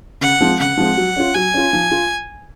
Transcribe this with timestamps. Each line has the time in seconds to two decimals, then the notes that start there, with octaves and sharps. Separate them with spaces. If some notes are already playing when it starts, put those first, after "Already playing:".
0.21 C#3 F#5
0.40 F3 G#3 C4
0.59 C#3 F#5
0.77 F3 G#3 C4
0.97 F#3
1.16 C#4 F4
1.34 F#3 G#5
1.54 C#4 F4
1.73 F3
1.91 F4